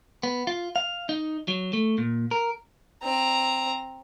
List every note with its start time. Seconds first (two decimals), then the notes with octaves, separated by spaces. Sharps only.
0.23 B3
0.47 F4
0.76 F5
1.09 D#4
1.48 F#3
1.73 A3
1.98 A#2
2.31 A#4
3.03 C4 A#5